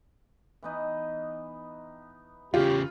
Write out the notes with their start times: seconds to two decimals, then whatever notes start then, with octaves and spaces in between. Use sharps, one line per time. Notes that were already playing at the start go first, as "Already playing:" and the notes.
0.63 E3 B3 D#4
2.54 E2 C#3 F4 G4